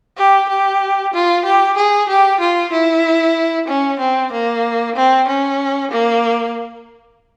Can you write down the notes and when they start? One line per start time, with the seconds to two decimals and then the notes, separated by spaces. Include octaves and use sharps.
0.18 G4
0.49 G4
1.14 F4
1.45 G4
1.77 G#4
2.09 G4
2.40 F4
2.73 E4
3.68 C#4
4.00 C4
4.32 A#3
4.96 C4
5.28 C#4
5.91 A#3